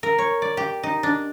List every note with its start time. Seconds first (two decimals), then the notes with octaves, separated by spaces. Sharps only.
0.03 A#4
0.18 C#5
0.42 D5
0.57 G4
0.83 D#4
1.03 D4